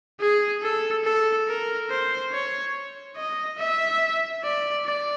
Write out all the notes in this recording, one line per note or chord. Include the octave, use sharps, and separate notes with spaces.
G#4
A4
A4
A#4
C5
C#5
D#5
E5
D5
D5